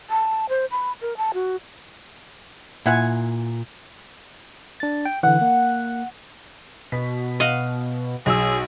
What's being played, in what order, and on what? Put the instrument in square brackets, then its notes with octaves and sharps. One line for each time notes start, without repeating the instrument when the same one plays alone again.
[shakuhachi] A5
C5
B5
A#4
A5
F#4
[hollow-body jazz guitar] A#2 [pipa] E4 F#5 G#5
[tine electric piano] D4 A6
G5
[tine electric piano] D3 E3 [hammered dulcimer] F#5
[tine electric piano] A#3
[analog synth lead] B2 [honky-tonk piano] B6
[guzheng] D#5 F5 F#5
[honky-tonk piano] B1 E6 [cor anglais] G#4